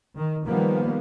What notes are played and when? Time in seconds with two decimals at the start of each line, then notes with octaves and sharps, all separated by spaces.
0.17 D#3
0.47 D#3 F3 G3 A#3 B3